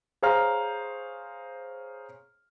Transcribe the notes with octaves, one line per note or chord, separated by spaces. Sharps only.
G#4 C5 C#5 F5 A#5 F6